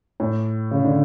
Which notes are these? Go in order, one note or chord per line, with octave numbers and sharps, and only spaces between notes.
A2
C#3
D3